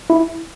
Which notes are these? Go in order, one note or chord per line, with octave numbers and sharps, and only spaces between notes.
E4